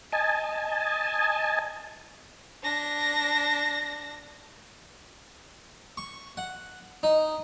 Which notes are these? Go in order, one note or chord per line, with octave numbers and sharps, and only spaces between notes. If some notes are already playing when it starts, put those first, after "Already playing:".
D#5 G#5 A5
D4 A#6
C#6
F#5
D#4